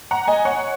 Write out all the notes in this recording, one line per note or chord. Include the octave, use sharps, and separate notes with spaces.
F#5 A#5
D#5 G#5
C#5 F#5